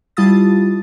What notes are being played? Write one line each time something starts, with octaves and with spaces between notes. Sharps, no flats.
G3 E4 F4 A5 D#6 A6